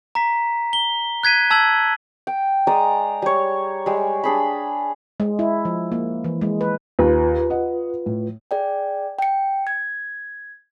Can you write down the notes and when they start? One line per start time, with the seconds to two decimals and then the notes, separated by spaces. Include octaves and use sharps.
0.15 A#5 B6
0.73 G7
1.23 F#6 G#6 B6 D#7
1.50 A5 E6 G#6 F#7
2.27 G5
2.67 G#3 D5 A#5 D#6
3.22 G3 C#5
3.86 G3 G#3
4.24 D4 G#4 B5
5.20 G#3
5.39 E4
5.65 F3
5.92 A#3
6.24 E3
6.41 G#3
6.61 B4
6.99 D#2 F4 B4
7.50 D#5 F#5
8.06 A2
8.51 G#4 D5 G5
9.19 G5 C#7
9.67 G#6